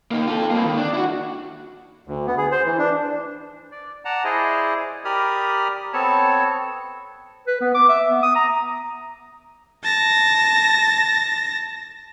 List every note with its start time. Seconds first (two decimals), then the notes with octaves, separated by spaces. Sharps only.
0.11 A#3 D#4
0.27 F4 A4
0.51 A#3 C4
0.65 D#3
0.77 D4
0.93 E4 F#4
2.07 D2
2.27 B3
2.38 G#4
2.52 C5
2.65 E3
2.78 D4
3.72 D5
4.05 D5 F#5 A5 A#5
4.24 E4 G#4 C5 D5 D#5
5.05 G4 A#4 D5 B5 D#6 F6
5.93 B3 C4 A4 C#5 A5
7.47 B4
7.61 B3
7.75 D6
7.89 E5
8.10 B3
8.23 D#6
8.36 A#5
9.84 A5 A#6